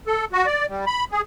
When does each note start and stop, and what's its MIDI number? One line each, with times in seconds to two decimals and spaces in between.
0.07 0.25 69
0.33 0.46 66
0.47 0.66 74
0.69 0.85 55
0.87 1.04 83
1.12 1.21 68